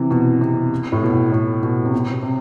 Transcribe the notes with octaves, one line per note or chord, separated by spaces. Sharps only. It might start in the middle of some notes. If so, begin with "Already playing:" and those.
Already playing: C3 E3
B2
C3
A2
B2
A2
B2
C3
B2
C3